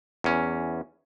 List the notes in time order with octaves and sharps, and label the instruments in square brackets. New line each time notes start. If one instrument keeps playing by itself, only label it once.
[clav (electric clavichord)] E2 C#4